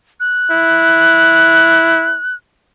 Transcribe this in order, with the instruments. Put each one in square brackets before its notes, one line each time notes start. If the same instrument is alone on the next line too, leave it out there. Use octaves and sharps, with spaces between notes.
[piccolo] F#6
[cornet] E4